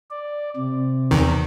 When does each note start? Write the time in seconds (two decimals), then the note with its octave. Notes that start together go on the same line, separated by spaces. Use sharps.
0.11 D5
0.57 C3
1.11 E2 D#3